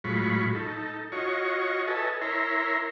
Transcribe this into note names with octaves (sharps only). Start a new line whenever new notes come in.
A2 F#3 G#3 F4 B5 C#6
D#4 A4
F4 F#4 C#5 D#5 C#6
A4 B4 D#5 E5 G#5 A5
E4 A#4 C#5 E5 A#5 C6